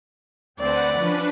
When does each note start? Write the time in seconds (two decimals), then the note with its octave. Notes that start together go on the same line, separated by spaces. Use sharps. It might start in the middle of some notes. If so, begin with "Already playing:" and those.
0.60 D2 C4 B4 D5 F#5
0.97 F3 C#4 D4 B4